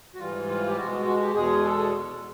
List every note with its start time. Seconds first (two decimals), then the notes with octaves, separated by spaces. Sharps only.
0.15 F#4
0.19 G#2 E3 G3 F4
0.49 F4
0.68 G4
0.77 B2 G#3 F#4
0.92 F#4
1.06 F#4
1.21 G4
1.35 E2 B2 G#3 G#4
1.64 A4